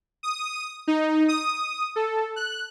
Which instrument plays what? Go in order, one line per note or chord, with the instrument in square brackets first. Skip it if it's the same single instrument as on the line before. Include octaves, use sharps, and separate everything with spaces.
[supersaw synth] D#6
D#4
D#6
A4
F#6